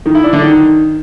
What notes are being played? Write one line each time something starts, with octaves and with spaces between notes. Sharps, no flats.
D#3
E4
D4
D3
D#3